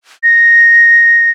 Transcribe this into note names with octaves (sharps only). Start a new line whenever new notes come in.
A#6